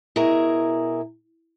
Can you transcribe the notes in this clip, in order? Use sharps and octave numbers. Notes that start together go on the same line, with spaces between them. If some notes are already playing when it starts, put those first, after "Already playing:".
B2 E4 G#4 A#4 A#5